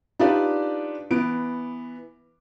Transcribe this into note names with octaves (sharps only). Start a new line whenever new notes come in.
D4 D#4 F4 G4 B4 D5
E3 B3 D7